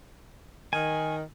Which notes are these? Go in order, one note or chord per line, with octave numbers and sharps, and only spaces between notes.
D#3 G#5